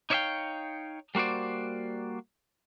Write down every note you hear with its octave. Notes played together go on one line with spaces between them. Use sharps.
D#4 C#5 D5 E5 F5 G5
G3 A#3 F#4 C5 D5